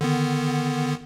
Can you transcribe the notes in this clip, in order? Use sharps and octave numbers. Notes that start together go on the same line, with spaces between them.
D3 D#3 B3